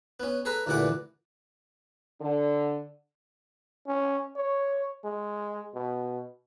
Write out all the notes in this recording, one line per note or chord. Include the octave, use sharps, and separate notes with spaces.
B3 C#4
G#4 A4 B4 A#5
D2 G2 A#2 E3 F#5 D6
D3
C#4
C#5
G#3
B2